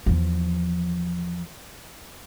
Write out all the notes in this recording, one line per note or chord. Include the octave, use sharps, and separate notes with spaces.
E2 F3